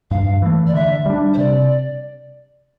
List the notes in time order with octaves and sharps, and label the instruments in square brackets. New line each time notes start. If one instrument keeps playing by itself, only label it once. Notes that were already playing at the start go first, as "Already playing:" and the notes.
[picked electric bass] G2 [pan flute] F5
[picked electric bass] E3 A3
[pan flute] D5
[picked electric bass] D3 [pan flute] E5
[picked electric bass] G3 D4
[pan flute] C5
[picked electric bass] C3 [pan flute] D5